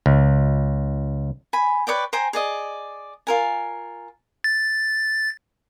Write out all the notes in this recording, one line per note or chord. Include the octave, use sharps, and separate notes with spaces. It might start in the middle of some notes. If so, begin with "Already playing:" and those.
C#2
G#5 B5
B4 C#5 D5 G5
C5 G5 G#5 A#5
G#4 D5 D#5
F4 A#4 G#5
A6